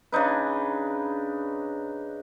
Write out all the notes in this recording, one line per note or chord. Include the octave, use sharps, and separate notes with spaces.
C#3 D4 D#4 B4